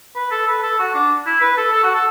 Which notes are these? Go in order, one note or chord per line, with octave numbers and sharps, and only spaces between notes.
B4
A4
B4
A4
F#4
D4
E4
B4
A4
A4
F#4
A4